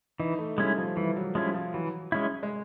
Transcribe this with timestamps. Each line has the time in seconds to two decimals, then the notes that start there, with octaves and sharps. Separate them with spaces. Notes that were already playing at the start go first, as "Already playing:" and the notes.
0.19 E3 D#4
0.39 A3
0.58 G3 G#3 C#4 E4
0.78 F3
0.96 E3 G3
1.16 F#3
1.35 F3 G#3 C#4 E4
1.54 F3
1.74 E3 F#3
2.12 G#3 C#4 E4
2.43 G#3